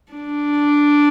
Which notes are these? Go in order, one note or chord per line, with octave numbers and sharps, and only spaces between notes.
D4